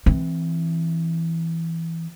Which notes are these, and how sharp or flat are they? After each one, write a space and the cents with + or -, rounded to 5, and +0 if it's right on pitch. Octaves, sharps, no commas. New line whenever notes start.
E3 +0 C4 +0